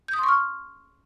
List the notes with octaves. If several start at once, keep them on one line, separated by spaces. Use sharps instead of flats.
G6
D#6
C6
C#6
F6